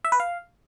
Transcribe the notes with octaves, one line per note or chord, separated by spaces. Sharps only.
E5
B4
F5